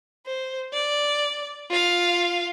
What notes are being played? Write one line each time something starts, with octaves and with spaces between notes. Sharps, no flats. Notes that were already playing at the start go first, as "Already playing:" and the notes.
C5
D5
F4 F5